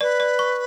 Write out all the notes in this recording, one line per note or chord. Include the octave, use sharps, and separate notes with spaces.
B4 D5
D5
C#6